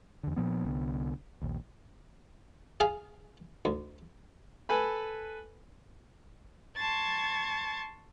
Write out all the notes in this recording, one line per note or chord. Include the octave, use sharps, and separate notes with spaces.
E2 D3
A#2 F3 B3
C2 D3 B3
A#1 D#2
G#4 F5 G#5
D2
A4 B4 G#5 B5
A5 C6 C#6 G#6 A6